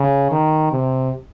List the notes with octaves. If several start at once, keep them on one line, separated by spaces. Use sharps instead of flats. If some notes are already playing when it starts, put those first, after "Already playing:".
Already playing: C#3
D#3
C3